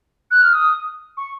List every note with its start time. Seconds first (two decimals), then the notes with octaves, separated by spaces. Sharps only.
0.31 F#6
0.42 F6
0.53 D#6
1.17 C#6